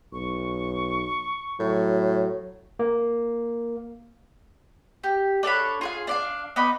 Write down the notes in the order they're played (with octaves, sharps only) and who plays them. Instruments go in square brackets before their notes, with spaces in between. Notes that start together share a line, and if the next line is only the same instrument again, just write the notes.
[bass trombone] B1 [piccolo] C#6
[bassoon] A2 [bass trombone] F#3
[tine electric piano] A#3
[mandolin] G4
D4 A4 C#5 B5
F4 G#4 F5
D4 D5 F5
B3 D#4 D5 B5